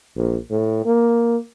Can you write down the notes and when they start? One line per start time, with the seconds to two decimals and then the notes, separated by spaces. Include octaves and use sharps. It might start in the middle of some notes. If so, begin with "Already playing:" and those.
0.16 A#1
0.51 A2
0.86 A#3